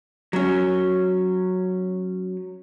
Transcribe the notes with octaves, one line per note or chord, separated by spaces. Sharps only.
F#3 C#4